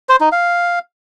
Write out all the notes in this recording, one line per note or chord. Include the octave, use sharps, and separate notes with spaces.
C5
D#4
F5